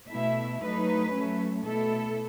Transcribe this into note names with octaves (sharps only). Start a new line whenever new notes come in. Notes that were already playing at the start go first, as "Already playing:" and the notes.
B2 A3 E4 E5
F#3 A3 D#4 B4
F#3 A3 C#4
B2 A3 E4 A4